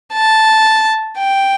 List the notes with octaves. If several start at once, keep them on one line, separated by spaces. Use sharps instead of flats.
A5
G5